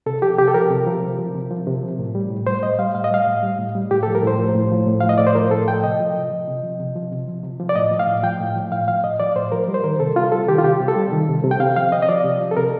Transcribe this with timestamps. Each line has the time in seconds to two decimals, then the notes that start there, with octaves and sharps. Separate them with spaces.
0.06 C3 A4
0.22 F3 G4
0.39 C3 G4
0.48 A4
0.54 F3 A#4
0.71 C3
0.86 F3
1.03 C3
1.19 F3
1.35 C3
1.51 F3
1.67 C3
1.83 F3
1.99 A2
2.15 G3
2.31 A2
2.47 G3 C5
2.63 A2 D#5
2.79 G3 F5
2.95 A2 F5
3.04 D#5
3.11 G3 F5
3.27 A2
3.43 G3
3.59 A2
3.75 G3
3.91 A2 G4
4.03 A4
4.07 F3
4.15 A#4
4.23 A2 C5
4.39 F3
4.55 A2
4.71 F3
4.87 A2
5.00 F3 F5
5.09 D#5
5.18 A2 D5
5.27 C5
5.35 F3 A#4
5.51 A2 A4
5.67 F3 G5
5.83 C3 D#5
6.00 F3
6.15 C3
6.31 F3
6.47 C3
6.63 F3
6.80 C3
6.96 F3
7.12 C3
7.28 F3
7.43 C3
7.60 F3
7.69 D5
7.75 A2 D#5
7.91 F3
7.99 F5
8.07 A2
8.23 F3 G5
8.40 A2
8.56 F3
8.72 A2 F5
8.88 F3 F5
9.04 A2 D#5
9.20 F3 D5
9.36 A2 C5
9.52 F3 A#4
9.68 G3
9.74 C5
9.84 D#3 A#4
10.00 C3 A4
10.16 C3 F4
10.32 G3 A4
10.48 D#3 G4
10.58 F4
10.64 C3 G4
10.80 C3
10.88 A4
10.96 G3
11.12 D#3
11.28 C3
11.44 C3
11.51 G5
11.60 C3 F5
11.76 F3 F5
11.92 C3 D#5
12.02 D#5
12.08 F3 D5
12.25 C3
12.40 F3
12.51 A4
12.57 C3 A#4